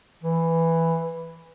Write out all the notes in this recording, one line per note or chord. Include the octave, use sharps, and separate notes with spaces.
E3